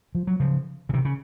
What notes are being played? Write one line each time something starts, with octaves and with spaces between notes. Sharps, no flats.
F3
F#3
C#3 F3
C#3
C3 D#3
C#3